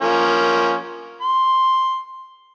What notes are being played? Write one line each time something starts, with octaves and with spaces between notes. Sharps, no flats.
F3 A#3 C#4
C6